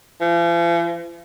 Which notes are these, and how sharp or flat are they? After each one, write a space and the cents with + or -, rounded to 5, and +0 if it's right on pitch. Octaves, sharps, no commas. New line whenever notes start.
F3 -45